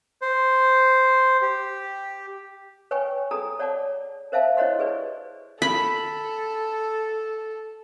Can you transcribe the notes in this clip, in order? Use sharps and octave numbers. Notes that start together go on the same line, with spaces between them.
C5
G4
B4 C#5 G5 G#5 C#6
G#4 A4 A#5 D#6
C#5 D5 F#5 A5 D6
A#4 C5 E5 F5 A5
E4 C5 C#5 D#5 F#5 C6
G4 G#4 B4 D5
A4 B5